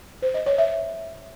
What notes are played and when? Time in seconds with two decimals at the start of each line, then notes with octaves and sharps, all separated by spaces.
0.22 C5
0.34 D#5
0.46 C#5
0.58 E5